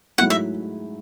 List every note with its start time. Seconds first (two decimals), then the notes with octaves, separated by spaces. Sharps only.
0.18 G#2 F#3 A3 E4 F#5
0.30 E5